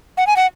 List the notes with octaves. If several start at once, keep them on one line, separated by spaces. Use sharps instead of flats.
F#5
G#5
F#5